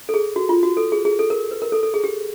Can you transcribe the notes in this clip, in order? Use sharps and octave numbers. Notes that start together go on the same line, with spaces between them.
A4
G#4
F#4
F4
F#4
A4
G#4
G#4
A4
A#4
B4
A#4
A4
A4
G#4
G4